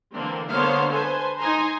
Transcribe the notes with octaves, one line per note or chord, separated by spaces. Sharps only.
D3 E3 A#3 C4 D4
D3 A#3 B3 C5 C#5 F5
A4 B4 C5 G#5
D#4 G#5 A#5 C6